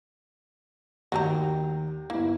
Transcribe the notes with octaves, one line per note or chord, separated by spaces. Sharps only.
D#2 F#3 G3 A#5 G6
G1 A#3 E4